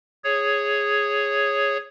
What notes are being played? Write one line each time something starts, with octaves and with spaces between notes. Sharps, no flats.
G#4 C#5